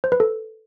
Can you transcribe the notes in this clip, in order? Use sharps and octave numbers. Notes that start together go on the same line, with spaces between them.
C5
B4
A4